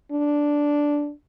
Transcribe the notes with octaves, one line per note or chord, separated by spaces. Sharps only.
D4